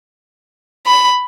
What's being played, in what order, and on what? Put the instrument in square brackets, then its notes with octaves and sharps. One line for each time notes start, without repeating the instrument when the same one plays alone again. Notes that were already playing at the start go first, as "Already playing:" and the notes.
[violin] B5